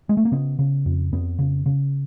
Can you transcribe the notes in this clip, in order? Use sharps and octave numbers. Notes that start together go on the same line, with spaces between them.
G#3
A3
A#3
C#3 B3
C#3
F2
F2 B3
C#3
C#3